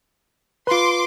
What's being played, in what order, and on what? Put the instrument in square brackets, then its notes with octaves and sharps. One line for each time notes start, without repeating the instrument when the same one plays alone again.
[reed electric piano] F4 B4 [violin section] C6 D6